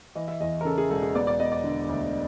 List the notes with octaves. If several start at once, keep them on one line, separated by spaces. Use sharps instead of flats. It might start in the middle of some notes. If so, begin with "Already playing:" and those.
E3 D#5
E5
E2 D#5
A#4
C#3 A4
G#4
E1 A4
G#4
B3 D5
D5
B3 D#5
D5
D3
D2